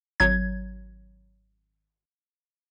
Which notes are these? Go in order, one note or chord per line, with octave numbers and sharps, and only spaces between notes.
G#1 F#3 G#6